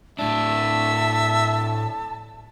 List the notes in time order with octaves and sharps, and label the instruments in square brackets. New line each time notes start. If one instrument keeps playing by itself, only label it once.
[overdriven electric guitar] A2 D4 [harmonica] E5 [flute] A5